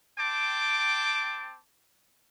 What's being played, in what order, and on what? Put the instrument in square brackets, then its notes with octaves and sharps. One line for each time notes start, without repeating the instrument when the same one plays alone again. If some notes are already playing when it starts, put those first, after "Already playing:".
[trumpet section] C4 G5 A5 D6